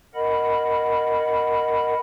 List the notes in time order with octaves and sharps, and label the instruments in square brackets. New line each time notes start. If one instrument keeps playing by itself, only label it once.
[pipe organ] A#4 D#5 F#5 B5